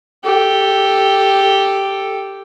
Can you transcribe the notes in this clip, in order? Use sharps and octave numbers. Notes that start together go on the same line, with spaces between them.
G4 A4